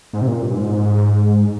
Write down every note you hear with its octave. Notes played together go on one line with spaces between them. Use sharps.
G#2
C3
A#2
G2
G#2